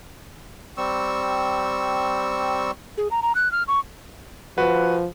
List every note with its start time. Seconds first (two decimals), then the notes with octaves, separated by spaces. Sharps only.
0.77 G3 C4 C#6 E6
2.98 G#4
3.11 A#5
3.22 A#5
3.35 F#6
3.52 F6
3.68 C#6
4.58 F3 F#4 B4